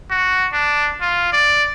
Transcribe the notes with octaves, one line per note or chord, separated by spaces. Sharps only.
F#4
D4
F4
D5